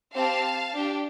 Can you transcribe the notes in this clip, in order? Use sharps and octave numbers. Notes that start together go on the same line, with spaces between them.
C4 G4 F5 A5
D4 G4